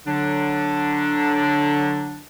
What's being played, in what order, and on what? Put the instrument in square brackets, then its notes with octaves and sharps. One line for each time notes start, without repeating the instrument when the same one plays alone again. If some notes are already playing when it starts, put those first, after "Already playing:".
[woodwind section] D3 F#3 D4